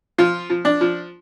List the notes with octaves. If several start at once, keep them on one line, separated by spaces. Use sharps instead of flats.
F3 F4
F3
D4
F3